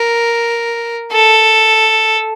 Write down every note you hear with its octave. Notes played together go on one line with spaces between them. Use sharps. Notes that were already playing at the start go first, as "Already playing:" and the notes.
Already playing: A#4
A4